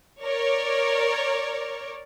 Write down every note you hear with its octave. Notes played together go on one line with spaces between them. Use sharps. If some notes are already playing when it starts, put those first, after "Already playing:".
A#4 C#5 D5